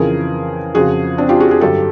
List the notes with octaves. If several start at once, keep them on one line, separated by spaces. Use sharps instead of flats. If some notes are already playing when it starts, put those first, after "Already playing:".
Already playing: F2 C#3 E3 G#4 A#4
F2 C#3 F3 F#4 G#4
C4 D4
F4 G4
F#4 G#4
F#4 G#4
G2 D3 F#3 G4 A4